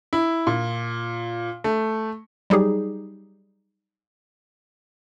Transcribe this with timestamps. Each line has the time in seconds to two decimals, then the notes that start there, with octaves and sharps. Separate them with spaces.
0.13 E4
0.47 A#2
1.64 A3
2.50 F#3 G3 D#4 G4 G#4